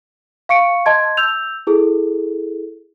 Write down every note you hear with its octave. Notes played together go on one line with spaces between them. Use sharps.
F5 C#6 C#7 D7
D#5 A5 C6 G#6
E6 G6 F7
E4 G#4 A4